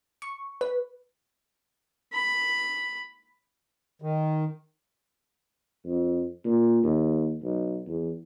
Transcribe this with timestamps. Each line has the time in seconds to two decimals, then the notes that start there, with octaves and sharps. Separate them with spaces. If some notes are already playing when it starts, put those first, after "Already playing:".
0.22 C#6
0.61 B4
2.13 B5
4.02 D#3
5.85 F2
6.45 A#2
6.83 D#2
7.43 B1
7.88 E2